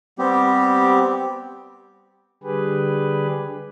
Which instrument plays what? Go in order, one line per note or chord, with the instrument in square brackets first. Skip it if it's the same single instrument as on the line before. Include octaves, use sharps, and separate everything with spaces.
[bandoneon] G3 B3 C4 G4
[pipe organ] D3 G3 G4 G#4 B4